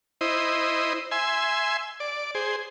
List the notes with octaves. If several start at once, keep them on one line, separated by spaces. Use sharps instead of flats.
E4 C5 D#5
E5 G#5 C6
D5
G#4 C5